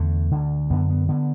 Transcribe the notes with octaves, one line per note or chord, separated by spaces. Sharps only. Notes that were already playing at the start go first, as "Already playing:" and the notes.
Already playing: E2 D3 A3
D2 D3
F#2 D3 B3
B3
D3 B3